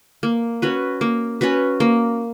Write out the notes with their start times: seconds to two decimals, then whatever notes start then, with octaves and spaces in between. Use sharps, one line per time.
0.23 A#3
0.62 C#4 F#4 B4
1.01 A#3
1.41 C#4 F#4 B4
1.80 A#3